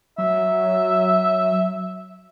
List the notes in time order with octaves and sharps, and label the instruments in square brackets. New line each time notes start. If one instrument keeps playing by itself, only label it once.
[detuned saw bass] F#3 [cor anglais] E5